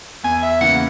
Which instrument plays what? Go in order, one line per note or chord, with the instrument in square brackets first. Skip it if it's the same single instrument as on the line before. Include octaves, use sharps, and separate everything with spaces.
[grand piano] E2 [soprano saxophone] G#5
[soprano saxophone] E5
[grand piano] C#3 E3 A#3 [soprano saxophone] F#5